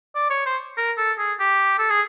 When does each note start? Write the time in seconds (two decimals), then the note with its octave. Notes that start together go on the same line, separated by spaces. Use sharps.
0.15 D5
0.30 C#5
0.46 C5
0.77 A#4
0.98 A4
1.18 G#4
1.40 G4
1.79 A4
1.90 G#4